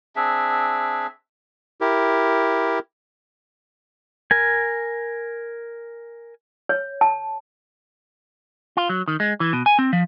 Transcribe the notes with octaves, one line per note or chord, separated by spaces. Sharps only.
C4 D4 G#4 E5
E4 G4 A#4
A#4 G#5
C#5
A5
F4
F#3
D#3
G#3
E3
B2
G#5
C4
F3